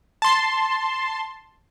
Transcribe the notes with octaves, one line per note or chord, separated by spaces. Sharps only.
A5 C6